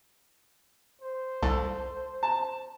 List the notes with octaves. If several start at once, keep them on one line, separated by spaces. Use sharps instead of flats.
C5
C2 A4
A5